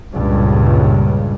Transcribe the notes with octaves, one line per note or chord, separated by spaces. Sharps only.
C#2 G2 A#2 C#3